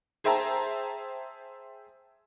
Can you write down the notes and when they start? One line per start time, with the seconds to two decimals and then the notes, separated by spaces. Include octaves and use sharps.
0.24 G#4 C5 E5 G5 A5 A#5